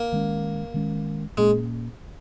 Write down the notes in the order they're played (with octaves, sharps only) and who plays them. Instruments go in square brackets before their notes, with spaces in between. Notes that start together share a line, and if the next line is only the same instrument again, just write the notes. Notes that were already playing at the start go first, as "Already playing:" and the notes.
Already playing: [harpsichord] A#3
[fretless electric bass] D#3 G#3 C#4
D#3 G#3 C#4
[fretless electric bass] A#2 A#3 C#4 [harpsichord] G#3